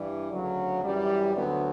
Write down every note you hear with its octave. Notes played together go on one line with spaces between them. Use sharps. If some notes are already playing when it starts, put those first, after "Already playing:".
Already playing: G2 E3 G3
D2 C#3 F#3
F#2 E3 G3
D2 D3 F#3 B3